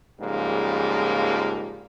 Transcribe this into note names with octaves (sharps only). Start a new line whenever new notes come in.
F2 G#2 C#3 F3 G3 A#3